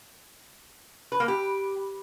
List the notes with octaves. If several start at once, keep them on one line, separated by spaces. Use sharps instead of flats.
B4
A#3
G4